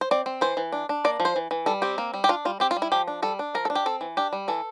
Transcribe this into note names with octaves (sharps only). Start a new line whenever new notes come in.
C5
C4 D5
C4
E3 C5
E3
D4
D4
A#3 D5
F3
C5
E3
E3
G3 A4
C4 G4
A#3
G3
G4
D4 F4
G3 F4
C4 G4
F4
G3
E4
F3 G4
D4
G3 A4
D4
F3 A#4
A4
D4
G4
C4 A4
E3
D4 G4
G3
E3 A4